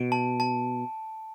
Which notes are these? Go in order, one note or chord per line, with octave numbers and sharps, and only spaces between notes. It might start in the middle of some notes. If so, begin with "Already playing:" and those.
Already playing: B2 D7
A5
A5